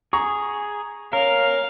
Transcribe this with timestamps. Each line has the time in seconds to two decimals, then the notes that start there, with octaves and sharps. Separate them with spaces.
0.13 G#4 A#5 C#6
1.13 C#4 A#4 F5